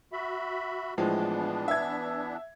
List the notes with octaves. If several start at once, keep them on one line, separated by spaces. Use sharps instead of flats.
F#4 E5 B5
A2 E3 F3 G#3 B3 D4
E5 G#6